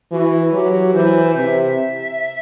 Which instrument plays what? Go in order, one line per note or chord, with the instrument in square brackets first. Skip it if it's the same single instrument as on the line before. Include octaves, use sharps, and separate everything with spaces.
[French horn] E3 [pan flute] F#4
[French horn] F#3 [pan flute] G4
[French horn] E3 [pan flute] C5
[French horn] C3 [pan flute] E5